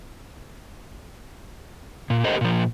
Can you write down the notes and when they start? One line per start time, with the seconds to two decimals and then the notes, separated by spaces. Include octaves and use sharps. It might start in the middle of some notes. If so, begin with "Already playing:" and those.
2.10 A#2
2.24 G4 A4 A#4 C5 D#5
2.41 A#2 F3